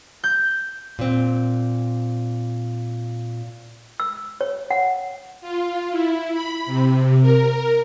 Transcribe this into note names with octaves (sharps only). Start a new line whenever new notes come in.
G6
A#2 C4
E6
C#5
F#5
F4
E4
B5
C3
A#4